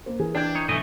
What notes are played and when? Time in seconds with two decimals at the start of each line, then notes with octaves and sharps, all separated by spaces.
0.06 A#3 C5
0.20 E3 G#4 A#4
0.35 D4 G5 G6 G#6
0.55 D#4 C#5
0.68 B1 E3 A3 D#5 G#5